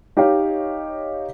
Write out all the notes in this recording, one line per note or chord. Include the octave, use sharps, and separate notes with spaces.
D#4 G4 C#5 D#5 F5